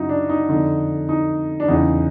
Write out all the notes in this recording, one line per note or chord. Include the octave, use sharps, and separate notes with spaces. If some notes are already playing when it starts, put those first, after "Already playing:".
Already playing: F#2 C#3 D#4 E4 F#4
D4
D#4
F2 D3 D#4
D#4
D4
E2 C#3 E3 D#4